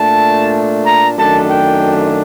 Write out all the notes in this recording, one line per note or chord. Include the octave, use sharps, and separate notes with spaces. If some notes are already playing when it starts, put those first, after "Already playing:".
Already playing: A#2 A3 D4 A5
A#5
F#2 D#3 A3 D4 A5
G5